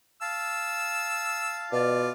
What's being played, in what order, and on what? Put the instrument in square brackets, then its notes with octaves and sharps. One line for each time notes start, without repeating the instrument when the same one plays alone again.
[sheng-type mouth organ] F5 A5 [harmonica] E6
[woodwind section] B2 D5 [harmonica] F4